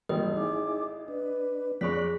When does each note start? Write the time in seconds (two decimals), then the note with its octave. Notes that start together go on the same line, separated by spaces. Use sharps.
0.09 G#1 E3 G3 A#3 D#5
0.37 D#4 E4 G#4 D6
1.08 D4 B4
1.81 F2 G#4 C#5 D5 C#6 F#6 B6